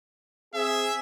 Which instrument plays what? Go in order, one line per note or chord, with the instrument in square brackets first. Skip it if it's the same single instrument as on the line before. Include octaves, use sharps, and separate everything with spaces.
[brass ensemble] C4 G#4 [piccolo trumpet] E5